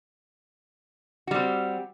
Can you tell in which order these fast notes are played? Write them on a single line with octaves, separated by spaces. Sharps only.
F#4 G3 C4